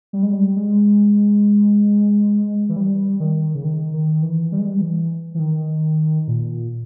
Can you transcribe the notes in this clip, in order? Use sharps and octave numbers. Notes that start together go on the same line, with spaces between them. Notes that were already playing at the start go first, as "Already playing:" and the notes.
G3
G#3
G3
G#3
E3
G3
D#3
C#3
D#3
D#3
E3
G3
G#3
G3
E3
E3
D#3
A#2